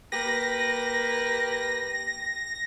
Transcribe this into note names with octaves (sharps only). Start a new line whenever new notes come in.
A#3 G4 B4 A#6